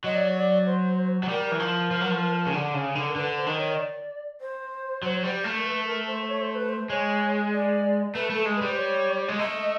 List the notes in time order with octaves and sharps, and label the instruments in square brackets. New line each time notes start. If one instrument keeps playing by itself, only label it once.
[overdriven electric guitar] F#3 [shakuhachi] D#5
[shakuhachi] D5
C#5
D5
C5
[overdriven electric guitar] F#3
[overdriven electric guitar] G3 [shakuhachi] A#4
[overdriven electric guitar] E3
F3
F3
F#3
F3
C#3
D3
C#3
D3
[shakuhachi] A#4
[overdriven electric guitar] D3 [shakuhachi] B4
[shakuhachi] C5
[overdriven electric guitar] D#3
[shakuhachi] C#5
D#5
D5
C5
[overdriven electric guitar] F#3
G3
A3
[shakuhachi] A#4
B4
A#4
C5
C#5
C5
B4
C5
[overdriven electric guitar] G#3 [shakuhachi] C#5
[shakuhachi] D5
[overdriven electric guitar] A3 [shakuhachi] B4
[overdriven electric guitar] A3 [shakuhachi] A4
[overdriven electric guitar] G#3
[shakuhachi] B4
[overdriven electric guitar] G3
[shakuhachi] C5
C#5
[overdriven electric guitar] G#3
[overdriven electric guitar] A3 [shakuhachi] D#5